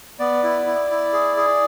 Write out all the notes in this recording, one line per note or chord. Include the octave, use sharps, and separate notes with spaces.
B3 D5
E4
E4
E4
G#4
G#4